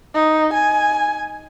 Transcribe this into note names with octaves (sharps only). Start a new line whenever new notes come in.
D#4
G#5